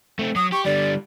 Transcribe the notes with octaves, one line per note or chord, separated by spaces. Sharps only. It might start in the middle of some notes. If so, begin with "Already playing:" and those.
A3 C4
F#3 D#6
G4 C#6
D3 G3 D5